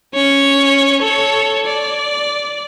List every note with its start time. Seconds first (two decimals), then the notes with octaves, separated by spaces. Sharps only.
0.14 C#4 C#5
1.01 A4 C#5
1.66 D5